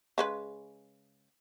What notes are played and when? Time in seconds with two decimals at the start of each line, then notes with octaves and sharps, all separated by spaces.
0.18 C#3 G#3 B4